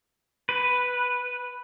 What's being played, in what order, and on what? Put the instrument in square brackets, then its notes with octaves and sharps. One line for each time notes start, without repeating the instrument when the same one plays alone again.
[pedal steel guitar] B4